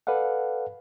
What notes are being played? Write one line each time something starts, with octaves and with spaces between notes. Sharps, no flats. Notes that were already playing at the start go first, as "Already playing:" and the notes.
A4 B4 D5 F5 F#5